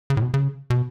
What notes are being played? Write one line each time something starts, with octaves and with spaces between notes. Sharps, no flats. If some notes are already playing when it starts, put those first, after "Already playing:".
C#3
A2
B2
C#3
B2